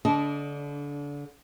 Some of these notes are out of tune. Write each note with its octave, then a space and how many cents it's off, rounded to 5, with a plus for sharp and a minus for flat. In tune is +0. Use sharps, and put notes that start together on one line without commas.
D3 -30 D4 -25 D#5 +0